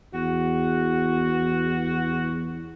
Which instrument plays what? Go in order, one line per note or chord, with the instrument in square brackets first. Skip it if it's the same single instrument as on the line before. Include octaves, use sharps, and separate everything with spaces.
[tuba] E2 [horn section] F#4